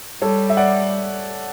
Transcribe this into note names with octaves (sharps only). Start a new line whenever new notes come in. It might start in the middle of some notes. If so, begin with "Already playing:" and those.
G3 A4 C#5
E5
D5 F#5